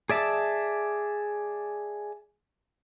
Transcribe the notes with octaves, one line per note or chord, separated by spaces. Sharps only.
G#4 D5 E5 A5